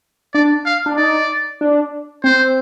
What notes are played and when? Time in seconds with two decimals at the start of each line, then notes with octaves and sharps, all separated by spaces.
0.33 D4 D5
0.65 F5
0.86 D4
0.97 D#4 D5
1.61 D4
2.24 C4 C5